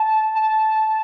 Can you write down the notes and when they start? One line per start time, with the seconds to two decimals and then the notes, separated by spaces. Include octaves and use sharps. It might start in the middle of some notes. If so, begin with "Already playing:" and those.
Already playing: A5
0.35 A5